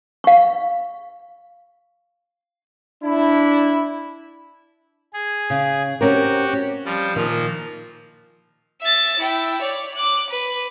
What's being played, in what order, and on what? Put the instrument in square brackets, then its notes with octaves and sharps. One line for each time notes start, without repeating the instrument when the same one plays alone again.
[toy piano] F5 C#6
[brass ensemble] D4 E4
[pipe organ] G#4
[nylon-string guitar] C#3
[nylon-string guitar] C4 C#4 A#4 [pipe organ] F#4 G4
[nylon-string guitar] C#4
[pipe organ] F3 G3
[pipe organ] A#2 F3 [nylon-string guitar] D#3
[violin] E5 A6
E4 G5
C#5 D5
D6 F#6
B4